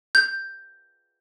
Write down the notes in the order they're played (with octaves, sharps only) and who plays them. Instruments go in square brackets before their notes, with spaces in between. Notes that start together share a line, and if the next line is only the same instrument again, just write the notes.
[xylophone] G6